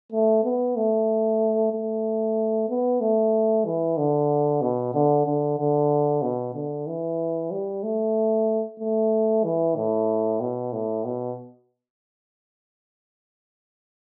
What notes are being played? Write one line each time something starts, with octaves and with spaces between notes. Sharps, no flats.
A3
B3
A3
A3
B3
A3
E3
D3
B2
D3
D3
D3
B2
D3
E3
G3
A3
A3
E3
A2
B2
A2
B2